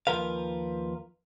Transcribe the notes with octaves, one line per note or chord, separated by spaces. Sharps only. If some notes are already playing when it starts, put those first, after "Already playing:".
D#2 F3 A#4 B4 F5